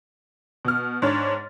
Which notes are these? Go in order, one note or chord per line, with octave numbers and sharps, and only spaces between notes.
B2 F6
G#2 D4 C#5 A6